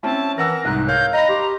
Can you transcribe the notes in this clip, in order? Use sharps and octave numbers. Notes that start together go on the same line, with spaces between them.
C4 C#4 E4 A5
E3 A#4 F#5 E6 A#6
C2 G#2 D#4 F#6
A#4 C#5 F5 F6 G6
D#5 A#5 B5 A#6
G4 C6